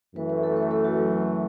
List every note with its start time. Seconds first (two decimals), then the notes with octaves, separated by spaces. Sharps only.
0.15 F#2 E3 A3 B4
0.30 B4
0.43 A4
0.56 B4
0.71 A4
0.85 F#4
0.98 F#3